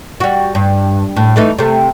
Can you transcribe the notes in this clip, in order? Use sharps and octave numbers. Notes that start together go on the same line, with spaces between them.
G3 F#4
G2
A2
E3 A3 D#4
C3 A3